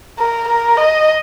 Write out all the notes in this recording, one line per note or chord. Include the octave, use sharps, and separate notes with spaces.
A#4
A#4
D#5